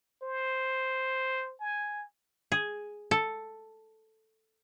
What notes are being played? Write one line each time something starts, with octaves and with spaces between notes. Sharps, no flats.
C5
G#5
G#4
A4